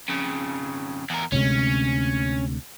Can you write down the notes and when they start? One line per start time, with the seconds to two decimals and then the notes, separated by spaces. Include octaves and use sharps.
0.08 F2 C#3
1.10 E2 A#4
1.32 D2 C3 G#3 C#4